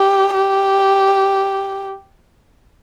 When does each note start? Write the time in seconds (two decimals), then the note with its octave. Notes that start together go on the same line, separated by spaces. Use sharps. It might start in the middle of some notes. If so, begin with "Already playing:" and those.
Already playing: G4
0.34 G4